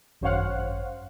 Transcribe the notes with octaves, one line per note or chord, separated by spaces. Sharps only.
G#1 F#2 C5 C#5 F5 F#5